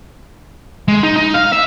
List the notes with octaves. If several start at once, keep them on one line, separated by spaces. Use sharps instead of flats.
G#3
D#4
D#4
F5
E5